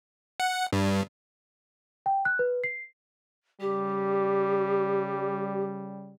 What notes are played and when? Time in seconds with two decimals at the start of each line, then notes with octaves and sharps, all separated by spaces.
0.40 F#5
0.72 G2
2.06 G5
2.25 F#6
2.39 B4
2.64 C7
3.60 C#3 G3 G4